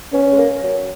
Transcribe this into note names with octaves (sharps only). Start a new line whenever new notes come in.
B3 C#4
G#3
A#3
F#3